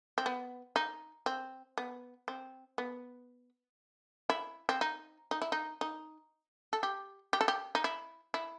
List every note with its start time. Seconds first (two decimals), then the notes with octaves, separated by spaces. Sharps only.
0.18 C4
0.26 B3
0.76 D#4
1.26 C4
1.78 B3
2.28 C4
2.78 B3
4.30 E4
4.69 C4
4.81 D#4
5.31 D#4
5.42 E4
5.52 D#4
5.81 D#4
6.73 A4
6.83 G4
7.33 G4
7.41 A4
7.48 G4
7.75 D#4
7.84 E4
8.34 E4